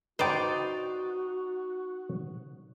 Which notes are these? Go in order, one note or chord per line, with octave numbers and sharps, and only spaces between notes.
D#4 F#4 B4 C5 D5 G5